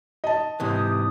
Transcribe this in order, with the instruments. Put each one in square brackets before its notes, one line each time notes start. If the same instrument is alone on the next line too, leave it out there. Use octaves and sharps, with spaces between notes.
[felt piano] D#5 A5
[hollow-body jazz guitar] G#2 C3 E3 [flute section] G4 D#6